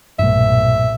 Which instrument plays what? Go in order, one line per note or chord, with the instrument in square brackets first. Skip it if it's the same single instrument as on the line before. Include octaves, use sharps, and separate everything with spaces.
[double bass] B1 A#2 [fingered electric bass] G2 F#3 A3 [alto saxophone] E5